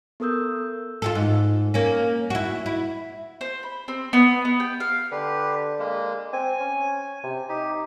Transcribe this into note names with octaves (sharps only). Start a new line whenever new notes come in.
B3 A4 A#4 D#6 E6 G6
F4 F#4 A4
G#2
A#3 C#4
E4 F#4
E4
C5
B5
C4
B3
B3
G5
F5
D3 G4 B4
G#3 A#3
C4 G#5
C#4
C3
D#4 G4